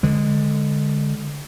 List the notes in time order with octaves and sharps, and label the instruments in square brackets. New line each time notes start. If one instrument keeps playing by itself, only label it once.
[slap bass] D3 G#3